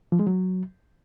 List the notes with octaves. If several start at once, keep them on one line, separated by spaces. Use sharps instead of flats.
F3
G#3
F#3